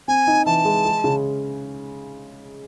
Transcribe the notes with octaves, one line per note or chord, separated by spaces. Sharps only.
C4 G#5
D#4
E3 A5
G#3
G#3
C#3